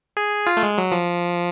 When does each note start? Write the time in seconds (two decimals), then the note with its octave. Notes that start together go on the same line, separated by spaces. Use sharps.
0.17 G#4
0.47 F4
0.57 A3
0.63 G#3
0.78 F#3
0.92 F3